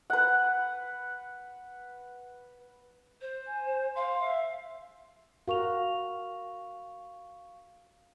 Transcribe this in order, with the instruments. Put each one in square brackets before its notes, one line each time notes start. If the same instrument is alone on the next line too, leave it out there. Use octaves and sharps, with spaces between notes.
[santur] B4 F#5
[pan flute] C5
[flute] G#5
[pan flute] F5 [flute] C6
[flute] E5
[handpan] F#4 A#4 [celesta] F5 C#6 F7